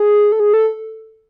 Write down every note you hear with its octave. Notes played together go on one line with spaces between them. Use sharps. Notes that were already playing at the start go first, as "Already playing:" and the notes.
Already playing: G#4
A4
G#4
A4